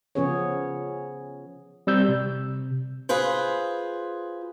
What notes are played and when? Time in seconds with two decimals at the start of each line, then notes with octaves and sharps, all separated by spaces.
0.15 C#3 F3 B3 C#4 G#4 C#5
1.87 G3 C4 E6 G6
2.08 C3
3.09 F4 G#4 B4 C5